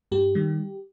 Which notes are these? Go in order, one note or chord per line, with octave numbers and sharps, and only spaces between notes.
G2 G4
D#3 G3